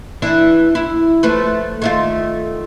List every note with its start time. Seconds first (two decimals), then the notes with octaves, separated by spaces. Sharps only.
0.22 E3 D4 E4
0.75 E4
1.23 F3 A3 B4
1.82 D#3 A3 F4